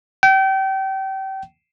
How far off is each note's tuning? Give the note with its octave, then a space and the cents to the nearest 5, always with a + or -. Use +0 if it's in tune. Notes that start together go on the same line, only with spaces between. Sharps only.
G5 -30